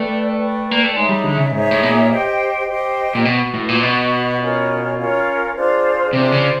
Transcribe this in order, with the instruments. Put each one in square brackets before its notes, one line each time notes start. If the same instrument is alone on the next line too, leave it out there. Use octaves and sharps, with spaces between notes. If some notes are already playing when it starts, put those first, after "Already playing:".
Already playing: [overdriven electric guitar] A3 [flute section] B4 D5 G5
[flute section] B4 D5 G5
[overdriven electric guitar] A#3
A3
[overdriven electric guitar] G#3 [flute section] D#4 G#4 C#5 E5
[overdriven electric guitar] G3
D3
C#3
[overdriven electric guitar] G#2 [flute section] D#4 G#4 C#5 E5
[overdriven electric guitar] A2
B2
A#2
[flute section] G4 C5 D#5 G5
G4 C5 D#5 G5
[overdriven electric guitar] A#2
[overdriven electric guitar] B2 [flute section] F#4 B4 D#5
[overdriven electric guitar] A2
A#2
[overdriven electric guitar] B2 [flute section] F#4 B4 D#5
[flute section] C#4 F4 A#4 C#5
C#4 F4 A#4 C#5
D4 F4 G#4 C5
[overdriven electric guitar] C3 [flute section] D4 F4 G#4 C5
[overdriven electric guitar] C#3